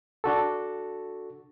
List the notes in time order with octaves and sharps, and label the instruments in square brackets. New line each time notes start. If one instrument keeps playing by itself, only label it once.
[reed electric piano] D4 F#4 A4